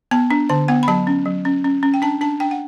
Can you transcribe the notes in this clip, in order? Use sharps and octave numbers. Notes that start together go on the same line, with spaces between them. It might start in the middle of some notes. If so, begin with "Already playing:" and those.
B3 A5
D4
D3 A5
B3 F#5
B5
F#3 A5
C#4
F#3
C#4
C#4
C#4
G5
D4 A5
D4 A5
D4 G5
F#5